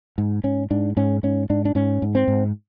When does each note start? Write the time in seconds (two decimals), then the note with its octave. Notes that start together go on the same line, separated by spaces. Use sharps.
0.18 G#2
0.44 G#2 C#4
0.71 G#2 D4
0.97 G#2 C#4
1.23 G#2 C#4
1.50 G#2 D4
1.65 D4
1.75 G#2 C#4
2.02 G#2
2.15 C4
2.28 G#2